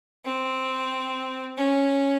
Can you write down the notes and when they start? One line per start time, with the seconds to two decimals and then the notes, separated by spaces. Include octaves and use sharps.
0.25 C4
1.58 C#4